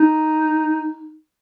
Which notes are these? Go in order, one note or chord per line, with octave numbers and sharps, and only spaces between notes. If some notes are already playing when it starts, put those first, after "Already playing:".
Already playing: D#4